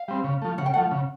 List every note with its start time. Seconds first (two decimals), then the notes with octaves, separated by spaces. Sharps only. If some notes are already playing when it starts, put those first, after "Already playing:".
Already playing: F5
0.08 G3 C4
0.24 C#3
0.42 F3 A3
0.58 C#3 F#5
0.66 G5
0.74 F3 A3 F#5
0.91 C#3